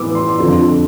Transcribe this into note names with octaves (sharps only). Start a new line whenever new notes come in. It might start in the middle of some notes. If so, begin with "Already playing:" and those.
Already playing: A2 E3 B3 D6 E6
C6
F2 D3 F3 C6